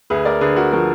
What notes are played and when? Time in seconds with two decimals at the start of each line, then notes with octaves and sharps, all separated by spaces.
0.10 D2 G#4 B4
0.25 A#4 D5
0.41 D3 G#4 B4
0.56 F#4 A#4
0.72 F3 F#4 A#4